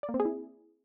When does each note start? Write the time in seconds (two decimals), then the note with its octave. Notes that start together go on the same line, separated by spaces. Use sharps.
0.03 D5
0.09 A#3
0.14 C4
0.20 G#4
0.25 E4